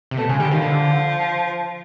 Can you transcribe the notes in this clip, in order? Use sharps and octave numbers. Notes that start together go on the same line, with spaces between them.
C3
B2 A3
C#3 G#3
D3 G3
D#3 F3
D3